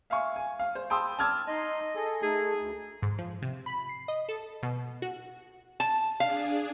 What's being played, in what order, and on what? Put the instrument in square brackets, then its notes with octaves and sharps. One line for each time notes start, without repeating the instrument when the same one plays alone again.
[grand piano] E5 F5 G#5 C#6
G#5
F5
C5
G5 A5 B5 C6 D#6 E6
A5 D6 E6 F6 G#6
[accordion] D#4 C6 [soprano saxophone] D#5
[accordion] G#4 A4
[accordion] A3 D#4 A4 [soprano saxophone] G#4
[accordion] D2
[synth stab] G#2
F3
C3
B5
C7
D#5
A4
B2
F#4
[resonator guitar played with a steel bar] A5
[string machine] D4 G#4 [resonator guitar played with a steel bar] F5